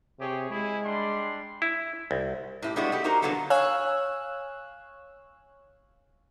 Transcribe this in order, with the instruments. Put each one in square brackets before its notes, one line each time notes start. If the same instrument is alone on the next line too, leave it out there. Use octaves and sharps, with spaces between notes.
[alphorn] C3 [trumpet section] G4 G#4 C#5
[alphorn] G#3 [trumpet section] E4 G#4
[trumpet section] G3 D4 C6
[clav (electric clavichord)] E4
C2
[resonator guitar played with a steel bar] A2 E4 G4
G3 G#3 B3 D4 E4 F#4
A3 G4
D#4 F#4 G4 A#4 C5
D3 F3 F#3 A#3 B3 A4
[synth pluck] C#5 F5 G#5 E6 F#6